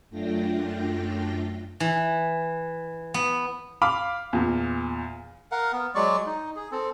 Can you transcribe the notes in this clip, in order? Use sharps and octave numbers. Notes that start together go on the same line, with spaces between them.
F#2 A3 D4 F4 G5 A#6
E3
B3
F5 B5 D6 F6
E2 A#2
A#4 F5 F#5
B3
F#3 G#3 D5 C#6
D#4
G#4
C4 A4